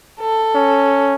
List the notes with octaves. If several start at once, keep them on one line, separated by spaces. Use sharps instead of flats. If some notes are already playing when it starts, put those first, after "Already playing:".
A4
C#4